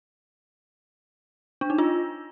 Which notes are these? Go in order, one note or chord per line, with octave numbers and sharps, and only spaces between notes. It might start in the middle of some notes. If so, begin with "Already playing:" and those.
D4
D#4
F4